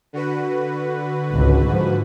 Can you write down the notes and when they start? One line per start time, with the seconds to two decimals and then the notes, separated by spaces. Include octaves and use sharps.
0.13 D3 F#4 B4
1.30 G#1 C#2
1.66 G#2 F3